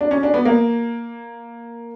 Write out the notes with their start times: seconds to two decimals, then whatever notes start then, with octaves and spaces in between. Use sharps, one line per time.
0.01 D4
0.11 C#4
0.23 D4
0.34 B3
0.45 A#3